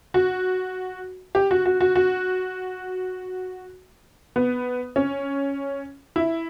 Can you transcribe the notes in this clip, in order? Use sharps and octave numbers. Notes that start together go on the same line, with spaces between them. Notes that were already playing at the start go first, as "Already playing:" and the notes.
F#4
G4
F#4
F#4
F#4
F#4
B3
C#4
E4